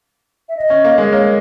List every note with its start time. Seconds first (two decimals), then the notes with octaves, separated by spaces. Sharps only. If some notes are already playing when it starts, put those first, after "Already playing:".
0.49 E5
0.57 D#5
0.70 C#4
0.85 A#3
0.98 G#3
1.13 A#3 C#5